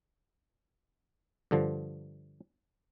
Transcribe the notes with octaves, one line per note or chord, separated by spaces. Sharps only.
G2 D3 F3